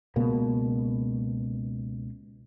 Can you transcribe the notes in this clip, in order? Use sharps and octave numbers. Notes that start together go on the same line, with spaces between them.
C#2 B2 A#3